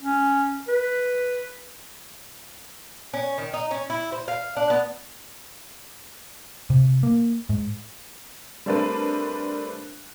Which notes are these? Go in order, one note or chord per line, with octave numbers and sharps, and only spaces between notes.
C#4
B4
C#4
D#3
D#4
C#4
E4
C5
F5
D4
B3
C3
A#3
G#2
G3 A3 C4 D4 A#4 B4